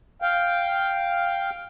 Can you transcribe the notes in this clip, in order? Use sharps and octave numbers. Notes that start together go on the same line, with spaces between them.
F5 G5